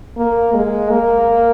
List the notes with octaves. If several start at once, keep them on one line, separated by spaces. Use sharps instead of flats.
A#3
G#3
A#3